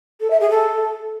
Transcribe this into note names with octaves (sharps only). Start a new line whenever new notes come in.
A4
E5
G#4
A4